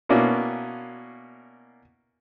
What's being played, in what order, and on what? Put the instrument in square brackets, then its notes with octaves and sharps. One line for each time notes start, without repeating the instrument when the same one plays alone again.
[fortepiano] B2 A#3 C#4 D4 E4